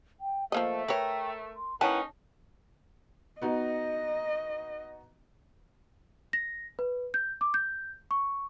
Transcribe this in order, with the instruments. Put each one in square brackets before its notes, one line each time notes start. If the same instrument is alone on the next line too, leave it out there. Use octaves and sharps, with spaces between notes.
[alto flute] G5
[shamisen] F3 A#3 D#5 [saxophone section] A3 [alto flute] C5
[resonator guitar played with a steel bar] A#4 [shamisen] B4 C#5 [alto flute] G5
[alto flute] C6
[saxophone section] A#3 C#4 D#4 [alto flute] E4 [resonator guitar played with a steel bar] B4 F#5 G5 [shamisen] A5
[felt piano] B3 D#4 F#4 [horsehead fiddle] D#5
[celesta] A#6
B4
G6
D6
G6
C#6